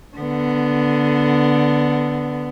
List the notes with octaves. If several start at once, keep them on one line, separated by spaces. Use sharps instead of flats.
D3 B3